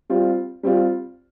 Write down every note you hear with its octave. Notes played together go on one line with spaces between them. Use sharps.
G3 C4 F4
G3 C4 F4